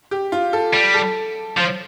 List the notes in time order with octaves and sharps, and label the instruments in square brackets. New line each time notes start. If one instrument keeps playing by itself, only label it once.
[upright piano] G4
F4
A4
[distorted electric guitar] G3
[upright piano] A4
[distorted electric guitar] F3 [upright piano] C5